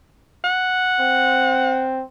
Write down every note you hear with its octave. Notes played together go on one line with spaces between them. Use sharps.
F#5
C4